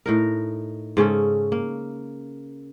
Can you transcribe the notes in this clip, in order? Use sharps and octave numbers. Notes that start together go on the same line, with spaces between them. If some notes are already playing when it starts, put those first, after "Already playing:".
A2 D#4 A#4
G#2 C#3 C#4 A4
A#3